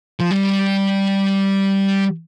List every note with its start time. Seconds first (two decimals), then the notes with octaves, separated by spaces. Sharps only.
0.20 F3
0.31 G3